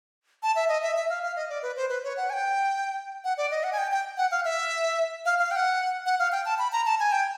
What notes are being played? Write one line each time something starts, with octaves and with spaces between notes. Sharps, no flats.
A5
E5
D#5
E5
E5
F5
F5
D#5
D5
B4
C5
B4
C#5
F#5
G#5
G5
F#5
D5
D#5
F#5
G#5
G5
G5
F#5
F5
E5
F5
F5
G5
F#5
F#5
F5
G5
A5
B5
A#5
A5
G#5
G5